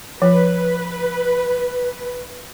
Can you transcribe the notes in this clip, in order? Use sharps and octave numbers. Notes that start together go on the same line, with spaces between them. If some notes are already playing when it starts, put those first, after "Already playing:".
F3 B4